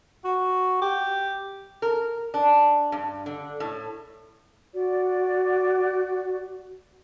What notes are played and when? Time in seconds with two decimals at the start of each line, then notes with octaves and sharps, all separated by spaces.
0.25 F#4
0.82 G4
1.82 A#4
2.34 D4
2.92 G2
3.26 D3
3.60 A2
4.72 F#4 D5